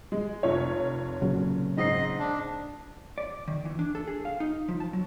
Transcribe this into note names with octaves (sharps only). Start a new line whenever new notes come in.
G#3
F1 F4 C#5
A#2 C#3 F#3
G#2 C4 D#5 C7
D4
D5
D#3
E3
D4
A4
G#4
F5
D#4
F3
A5
F#3